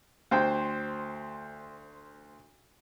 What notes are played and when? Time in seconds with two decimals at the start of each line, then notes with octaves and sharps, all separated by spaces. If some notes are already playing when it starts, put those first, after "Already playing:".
0.31 D2 C5 G5